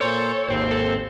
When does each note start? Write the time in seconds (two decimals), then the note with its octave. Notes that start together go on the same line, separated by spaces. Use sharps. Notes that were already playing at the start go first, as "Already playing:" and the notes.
0.01 A#2 A4 C5 C#5
0.49 G#1 D#2 C5 G5
0.71 A4